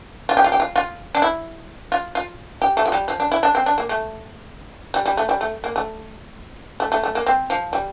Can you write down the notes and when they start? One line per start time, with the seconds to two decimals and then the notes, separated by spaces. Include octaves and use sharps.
0.29 F4
0.37 G4
0.44 F4
0.52 G4
0.60 F4
0.76 F4
1.15 D4
1.22 E4
1.92 F4
2.15 F4
2.62 G4
2.77 A3
2.86 F3
2.92 G3
3.08 F3
3.20 D4
3.32 E4
3.43 D4
3.55 C4
3.66 D4
3.78 A#3
3.89 A3
4.94 G3
5.06 G3
5.17 A3
5.29 G3
5.41 A3
5.64 A#3
5.76 A3
6.80 A3
6.92 A3
7.03 A3
7.15 A#3
7.26 C4
7.50 F3
7.73 G3